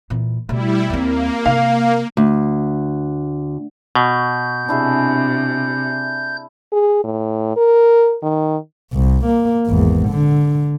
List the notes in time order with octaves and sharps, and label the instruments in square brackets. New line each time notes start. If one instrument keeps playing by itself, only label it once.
[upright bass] A#2 E3
[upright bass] B2 A3 [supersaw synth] G3 E4
[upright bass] D#2 C4 [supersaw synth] A#3
[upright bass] C3 [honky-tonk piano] F5
[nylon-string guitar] D2
[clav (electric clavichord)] B2 [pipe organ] G6
[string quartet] C3 [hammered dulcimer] D4 E4 G#4
[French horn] G#4
A2
A#4
D#3
[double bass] C2
A#3
G#1 E2
D3